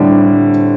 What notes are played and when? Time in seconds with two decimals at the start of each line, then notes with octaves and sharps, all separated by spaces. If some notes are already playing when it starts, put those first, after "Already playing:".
Already playing: A2 D3 G3 C4